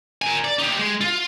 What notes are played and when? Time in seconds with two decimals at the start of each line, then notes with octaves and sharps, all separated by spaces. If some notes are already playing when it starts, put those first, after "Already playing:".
0.22 A#4 G#5
0.45 D5
0.59 D#4 G4
0.79 G#3
1.01 F4